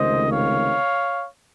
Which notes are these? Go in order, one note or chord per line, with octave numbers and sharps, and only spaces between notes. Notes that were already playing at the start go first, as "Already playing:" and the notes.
Already playing: C#2 C3 D#3 A3 C5 D#5
C#5 F5